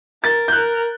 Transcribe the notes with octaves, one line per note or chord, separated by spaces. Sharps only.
A#4 A6
G6
A#4 F#6